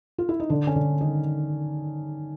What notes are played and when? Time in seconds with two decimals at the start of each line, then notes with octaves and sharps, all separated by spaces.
0.18 F4
0.29 E4
0.40 D#4
0.50 D3 D4
0.67 C#4
0.76 D3 D4
1.00 D#3 D#4